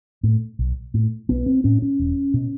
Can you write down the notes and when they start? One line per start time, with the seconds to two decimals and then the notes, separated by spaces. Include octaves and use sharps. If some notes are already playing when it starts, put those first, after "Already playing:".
0.23 A2
0.59 B1
0.94 A2
1.29 B1 B3
1.46 C4
1.64 A2 C#4
1.82 C#4
1.99 E1
2.34 B2